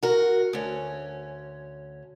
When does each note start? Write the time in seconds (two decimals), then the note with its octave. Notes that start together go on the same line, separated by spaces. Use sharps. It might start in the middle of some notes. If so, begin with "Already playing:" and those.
0.03 F#4 A#4
0.53 D2 C#4